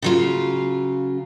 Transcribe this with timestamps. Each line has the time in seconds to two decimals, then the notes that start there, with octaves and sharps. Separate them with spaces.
0.02 C#3 F#3 F4